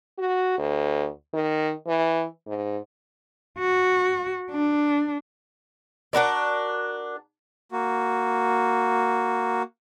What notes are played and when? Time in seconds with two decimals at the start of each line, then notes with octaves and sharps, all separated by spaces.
0.19 F#4
0.58 D2
1.33 D#3
1.87 E3
2.47 G#2
3.59 F#4
4.51 D4
6.13 D4 F#4 A#4 D5
7.72 A#3 F#4